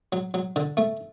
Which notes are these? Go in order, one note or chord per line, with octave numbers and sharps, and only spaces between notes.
F#3
F#3
D3
A3